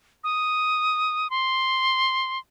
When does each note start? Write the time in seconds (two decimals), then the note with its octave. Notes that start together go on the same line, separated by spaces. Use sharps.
0.24 D#6
1.30 C6